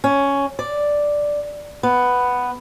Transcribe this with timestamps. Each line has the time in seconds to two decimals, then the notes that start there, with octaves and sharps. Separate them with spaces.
0.04 C#4
0.59 D5
1.83 B3